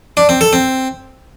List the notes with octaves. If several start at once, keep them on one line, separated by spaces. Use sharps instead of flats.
D4
C4
A4
C4